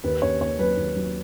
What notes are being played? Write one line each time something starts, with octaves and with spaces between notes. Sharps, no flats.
D#2 B4
D#2 C#5
D#2 C#5
F#3 B4
D#2
F#3